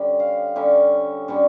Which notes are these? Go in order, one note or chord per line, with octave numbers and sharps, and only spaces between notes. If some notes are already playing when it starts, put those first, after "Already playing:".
Already playing: D3 G3 C#4
F5
D3 G3 C#4 E5
D3 G3 C#4